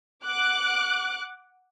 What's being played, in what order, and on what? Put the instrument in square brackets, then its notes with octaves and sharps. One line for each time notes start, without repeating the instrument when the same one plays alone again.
[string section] F#5 D6 F#6